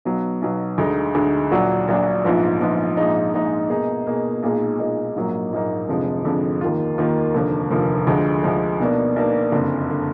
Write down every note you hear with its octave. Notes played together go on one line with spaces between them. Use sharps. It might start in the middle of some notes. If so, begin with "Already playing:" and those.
B1 B2 F#3
B1 B2 F#3
D2 D3 G#3 D#4
D2 D3 G#3 D#4
A#1 A#2 F#3 D4 F#4
A#1 A#2 F#3 D4 F#4
A#1 G#2 F3 B3 F4
A#1 G#2 F3 B3 F4
A#1 G#2 F3 G#3 D#4
A#1 G#2 F3 G#3 D#4
B2 A#3 D#4 G#4
B2 A#3 D#4 G#4
B1 A#2 G#3 D#4 G#4
B1 A#2 G#3 D#4 G#4
A#1 G#2 F#3 A#3 D#4
A#1 G#2 F#3 A#3 D#4
F1 F2 D3 F3 G#3
F1 F2 D3 F3 G#3
D#2 D#3 A#3 F4
D#2 D#3 A#3 F4
F1 D#2 D3 F3 A#3
F1 D#2 D3 F3 A#3
D2 D3 F3 G#3
D2 D3 F3 G#3
B1 B2 A#3 D4
B1 B2 A#3 D4
F#1 F2 D3
D3